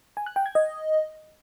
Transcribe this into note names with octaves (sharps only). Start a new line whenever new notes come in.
G#5
F#6
G5
G#6
D#5